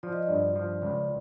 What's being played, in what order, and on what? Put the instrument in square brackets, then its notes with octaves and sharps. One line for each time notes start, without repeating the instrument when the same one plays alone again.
[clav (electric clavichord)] F3 [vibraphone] D5
[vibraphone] D#5
D5
[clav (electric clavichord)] G2
F3
C#2